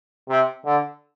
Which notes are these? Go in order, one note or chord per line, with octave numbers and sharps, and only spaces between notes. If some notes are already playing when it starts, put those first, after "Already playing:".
C3
D3